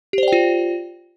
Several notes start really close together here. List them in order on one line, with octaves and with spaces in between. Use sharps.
G4 C5 D5 G5 F4